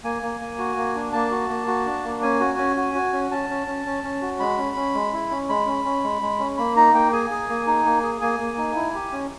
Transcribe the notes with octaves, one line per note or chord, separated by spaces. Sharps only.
A#3 G#5
A#3
A#3
F#4
A#3
D4
A#3 A5
F#4
A#3
F#4
D4
A#3
C#4 G#5
F#4
C#4
F#4
F#4
C#4
C#4 A5
C#4
C#4
C#4
C#4
F#4
G#3 B5
C#4
C#4
G#3
E4
C#4
G#3 B5
C#4
C#4
G#3
G#3
C#4
A#3 B5
D#4 A#5
A#3 G5
G#4 G#5
G#4
A#3
D#4
A#3
G#4
A#3 G#5
A#3
D#4
E4
G4
C#4